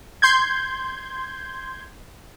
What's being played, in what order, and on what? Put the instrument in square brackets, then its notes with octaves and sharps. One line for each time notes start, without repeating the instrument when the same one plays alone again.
[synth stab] C6 G6 G#6